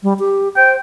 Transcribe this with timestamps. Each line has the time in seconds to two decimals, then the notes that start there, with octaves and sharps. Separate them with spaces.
0.03 G3
0.19 G4
0.56 C5 G5